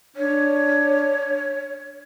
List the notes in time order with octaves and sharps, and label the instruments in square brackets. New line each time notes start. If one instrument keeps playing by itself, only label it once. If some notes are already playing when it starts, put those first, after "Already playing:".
[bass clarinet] D4 [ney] C#5